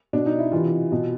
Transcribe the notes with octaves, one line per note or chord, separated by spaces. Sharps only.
B2 D4
D#4
E4
C3 E3 F4
B2